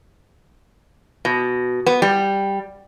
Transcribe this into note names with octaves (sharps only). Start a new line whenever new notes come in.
B2
B3
G3